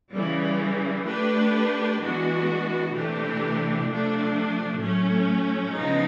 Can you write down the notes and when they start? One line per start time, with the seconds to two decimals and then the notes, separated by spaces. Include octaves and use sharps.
0.13 C#3 E3 G3
1.05 A3 D4 G4 B4
1.99 E3 G#3 B3 D4 F#4
2.92 C3 E3 A3 D4 G4
3.86 C3 F3 A3 D4
4.80 A2 F#3 A3 C#4
5.73 C#3 F3 G#3 B3 D#4